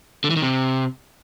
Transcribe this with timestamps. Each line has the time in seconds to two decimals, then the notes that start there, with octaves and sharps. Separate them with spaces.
0.24 D3
0.30 E3
0.36 D#3
0.42 C3